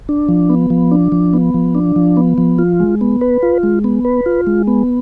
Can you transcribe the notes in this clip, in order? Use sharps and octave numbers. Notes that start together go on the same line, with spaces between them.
D4
F3
B3
F3
D4
F3
B3
F3
D4
F3
B3
F3
F4
G#3
B3
B4
F4
G#3
B3
B4
F4
G#3
B3